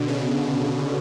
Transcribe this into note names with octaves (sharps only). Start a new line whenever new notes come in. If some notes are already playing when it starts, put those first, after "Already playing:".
Already playing: B2 D3
C#3